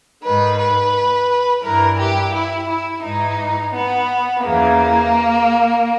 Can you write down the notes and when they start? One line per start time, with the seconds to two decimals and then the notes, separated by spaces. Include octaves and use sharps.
0.23 G#2 D#3 B4
0.58 B4
1.63 G2 E3 A#4
1.98 G4
2.34 E4
2.69 E4
3.03 G#2 E3 D#4
3.73 B3
4.43 E2 C#3 E3 A#3